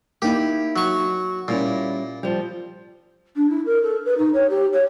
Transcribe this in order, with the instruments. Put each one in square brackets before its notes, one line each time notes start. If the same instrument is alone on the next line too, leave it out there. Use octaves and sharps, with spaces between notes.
[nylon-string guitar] A#3 D#4 E4 [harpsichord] G4
[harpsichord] F#3 C#6
[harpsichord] A#2 [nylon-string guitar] G3 C#4 E4
[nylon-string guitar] F3 G3
[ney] D4
E4
A#4
A4
B4
D#4
C#5
G4
C#5